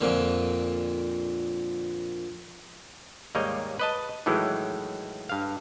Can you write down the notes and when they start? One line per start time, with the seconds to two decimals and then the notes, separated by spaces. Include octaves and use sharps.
0.01 F2 A#2 D3
3.35 D#2 G#2 G3 A#3 C#5 D#5
3.79 B4 D#5 A5
4.26 A2 D#3 E3 F#3 G#3
5.29 G2 F5